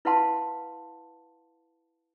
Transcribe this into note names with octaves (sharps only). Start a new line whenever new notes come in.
E4 B4 F5 F#5 A5 C6